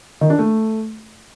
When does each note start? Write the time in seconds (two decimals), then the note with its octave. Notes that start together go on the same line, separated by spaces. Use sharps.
0.21 D#3
0.30 D4
0.39 A3